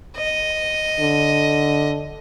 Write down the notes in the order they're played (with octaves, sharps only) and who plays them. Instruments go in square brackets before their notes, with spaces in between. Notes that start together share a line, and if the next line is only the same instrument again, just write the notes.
[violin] D#5
[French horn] D3